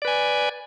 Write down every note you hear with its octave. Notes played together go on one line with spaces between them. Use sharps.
B4 D5 G#5